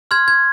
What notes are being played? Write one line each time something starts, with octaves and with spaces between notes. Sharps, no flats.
C6 F6 G#6
G#6